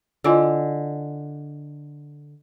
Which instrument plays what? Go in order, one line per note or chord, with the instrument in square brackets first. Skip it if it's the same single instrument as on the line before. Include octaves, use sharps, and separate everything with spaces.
[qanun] D3 [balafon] E4 F4 C#5 [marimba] D#5 G#5 E6